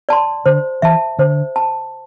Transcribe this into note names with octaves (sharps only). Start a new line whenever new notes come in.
D5 A5 C6
D3 C5
E3 E5 A5
D3 C5
A5